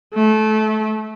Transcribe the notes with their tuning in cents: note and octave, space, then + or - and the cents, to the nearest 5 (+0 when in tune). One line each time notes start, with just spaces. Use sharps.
A3 -25